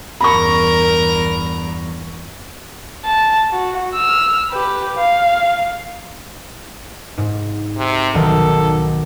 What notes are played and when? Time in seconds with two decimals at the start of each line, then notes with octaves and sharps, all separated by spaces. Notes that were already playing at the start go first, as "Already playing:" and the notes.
0.21 E2 G2 A#4 A#5 B5 C#6
3.05 A5
3.52 F#4
3.94 E6 F6
4.51 G4 B4
4.98 F5
7.18 G#2
7.77 C3
8.14 B1 D#3 A4 F5